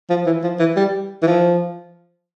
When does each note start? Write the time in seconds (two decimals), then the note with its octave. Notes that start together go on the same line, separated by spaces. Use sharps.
0.10 F3
0.26 E3
0.44 F3
0.59 E3
0.76 G3
1.23 E3
1.27 F3